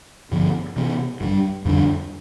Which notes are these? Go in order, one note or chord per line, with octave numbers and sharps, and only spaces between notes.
G2 D3 F3 B3
C3 E3 B3
G2 E3 G3
F2 D3 G3 D4